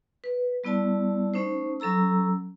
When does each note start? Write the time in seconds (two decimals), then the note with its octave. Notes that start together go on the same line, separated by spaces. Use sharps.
0.24 B4
0.64 G3 B3 E4 D5 A5
1.34 A3 C#4 D#4 C5
1.80 F#3 C#4 A4 A#5 E6